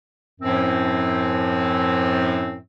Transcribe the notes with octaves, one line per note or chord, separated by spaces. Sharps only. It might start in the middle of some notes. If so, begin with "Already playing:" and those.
F#2 A2 F3 C4